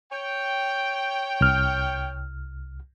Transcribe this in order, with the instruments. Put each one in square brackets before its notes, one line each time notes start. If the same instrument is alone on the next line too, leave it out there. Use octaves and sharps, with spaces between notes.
[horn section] C#5 G5
[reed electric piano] C2 F6